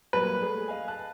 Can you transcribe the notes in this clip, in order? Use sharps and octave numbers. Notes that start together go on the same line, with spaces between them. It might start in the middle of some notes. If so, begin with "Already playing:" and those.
F#3 G3 A#3 B4
A3 G#4
D#5 F5 G#5
A5 F#6